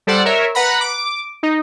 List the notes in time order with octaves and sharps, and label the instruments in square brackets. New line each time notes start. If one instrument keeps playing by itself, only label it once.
[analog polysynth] G3 A4 C5 D5 F#5
A#4 C#5 E5
B4 F#5 A#5 B5
D6
D#4